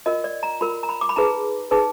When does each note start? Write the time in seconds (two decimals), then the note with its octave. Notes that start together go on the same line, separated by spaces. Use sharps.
0.06 F4 A#4 D#5
0.24 D5
0.43 A#5
0.61 F4 A#4 B5
0.83 A#5
0.89 B5
1.01 D6
1.09 B5
1.16 D#4 G#4 B4 A#5
1.71 D#4 G#4 B4